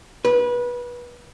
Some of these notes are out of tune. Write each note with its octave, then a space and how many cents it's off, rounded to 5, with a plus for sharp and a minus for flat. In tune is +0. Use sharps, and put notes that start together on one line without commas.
B4 -25